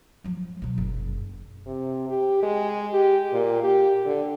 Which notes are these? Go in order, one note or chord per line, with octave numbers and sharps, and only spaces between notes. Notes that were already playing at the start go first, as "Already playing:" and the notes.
F3 F#3
B2 F#3
F#1
C3
G4
G#3
G4
A#2
G4
D3